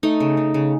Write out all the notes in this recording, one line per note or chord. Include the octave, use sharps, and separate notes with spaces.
A3 D#4
C#3
C#3
C#3